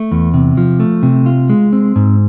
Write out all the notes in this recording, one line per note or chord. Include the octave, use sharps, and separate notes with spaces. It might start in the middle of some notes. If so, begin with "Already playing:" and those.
Already playing: A3
E2
C3
F3
A3
C3
F4
G#3
C4
G#2